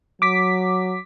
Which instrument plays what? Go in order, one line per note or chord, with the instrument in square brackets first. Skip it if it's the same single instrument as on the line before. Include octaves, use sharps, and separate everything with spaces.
[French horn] F#3 [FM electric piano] D6 B6